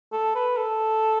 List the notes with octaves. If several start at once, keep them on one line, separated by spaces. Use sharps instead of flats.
A4
B4
A4